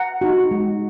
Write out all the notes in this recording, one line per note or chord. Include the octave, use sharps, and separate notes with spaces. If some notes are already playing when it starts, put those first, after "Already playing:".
Already playing: F#5 A#5
D#4 F#4
G#3